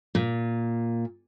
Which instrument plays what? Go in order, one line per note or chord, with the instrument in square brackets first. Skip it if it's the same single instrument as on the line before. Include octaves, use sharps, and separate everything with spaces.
[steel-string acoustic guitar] A#2